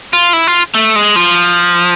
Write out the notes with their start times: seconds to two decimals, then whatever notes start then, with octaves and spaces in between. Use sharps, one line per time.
0.13 F4
0.33 E4
0.47 F4
0.75 A3
0.96 G#3
1.16 F3